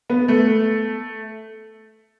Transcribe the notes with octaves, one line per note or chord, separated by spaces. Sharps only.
B3
A3